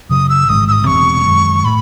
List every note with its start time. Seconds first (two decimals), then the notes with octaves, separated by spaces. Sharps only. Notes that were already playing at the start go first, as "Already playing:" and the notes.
0.10 F#2 C#3 F#3 D#6
0.29 E6
0.49 A1 G#2 D#3 G#3 D#6
0.68 E6
0.72 D#6
0.87 E1 D2 C3 E3 C#6
1.26 F#2 D#3 G#3
1.65 A2 B5